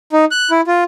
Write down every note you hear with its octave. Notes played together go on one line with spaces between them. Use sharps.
D#4
F#6
E4
F4